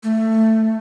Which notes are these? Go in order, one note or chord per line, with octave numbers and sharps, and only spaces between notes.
A3